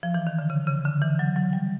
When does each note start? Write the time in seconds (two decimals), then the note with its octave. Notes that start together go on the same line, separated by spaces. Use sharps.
0.03 F3
0.14 E3
0.27 D#3
0.39 D3
0.50 C#3
0.67 C#3
0.85 D3
1.01 E3
1.19 F#3
1.36 F#3
1.53 G3